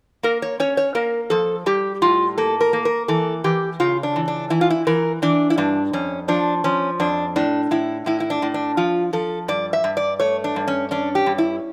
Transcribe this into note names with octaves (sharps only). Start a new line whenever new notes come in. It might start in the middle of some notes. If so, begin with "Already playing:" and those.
A#3 A#4
C#5
C#4 C#5
C#5
A#3 A#4
F3 A4
G3 G4
A2 F4
A#3 A4
A#4
A#3
A#4
E3 A4
E3 G4
C#3 F4
D4
E3
D4
E3 E4
F4
E4
E3 A#4
E3 D4
E4
G2 D4
F2 C#4
F3 D4
F3 C#4
F2 D4
A2 D4
A2 E4
A2 E4
E4
D4
A2
D4
F3 F4
F3 A4
G2 D5
E5
G2
D5
A3 C#5
D4
G2
C#4
C#4 D4
G4
G2
E4